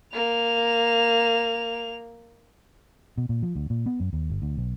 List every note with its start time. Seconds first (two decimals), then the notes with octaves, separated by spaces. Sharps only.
0.14 A#3 F7
3.17 B2
3.29 A#2
3.43 F3
3.55 D2
3.70 A#2
3.86 B3
4.00 F#2
4.13 D#2
4.30 G1
4.42 D2
4.57 B1